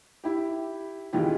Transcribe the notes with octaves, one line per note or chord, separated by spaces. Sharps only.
E4 G4
C#2 D#3 E3 F4 G4